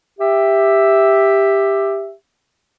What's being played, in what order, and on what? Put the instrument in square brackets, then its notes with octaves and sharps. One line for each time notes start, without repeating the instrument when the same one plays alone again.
[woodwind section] G4 E5